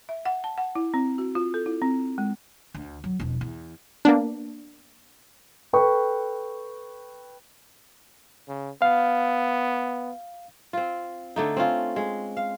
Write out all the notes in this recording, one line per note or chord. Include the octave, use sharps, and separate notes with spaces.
E5
F#5
A5
F#5
E4
C4
F#4
F4
A4
E4
C4
G#3
D2
F#3
E1 F2
E2
A#3 B3 D4
A4 B4 G5 C#6
C#3
B3 F5
C4 F4
D3 A3 D#4
C4 C#4 F4
G#3
F5